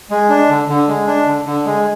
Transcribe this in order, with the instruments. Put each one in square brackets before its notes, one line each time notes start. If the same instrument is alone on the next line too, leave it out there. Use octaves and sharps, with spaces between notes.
[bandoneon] G#3
D4
D3
D3
G#3
D4
D3
D3
G#3